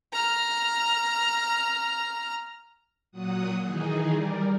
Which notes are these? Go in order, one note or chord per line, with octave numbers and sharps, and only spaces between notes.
A#5 F6
A#2 F#3 F#5 D#6
D#3 E3 D#4 G#4
G3 A#4 D5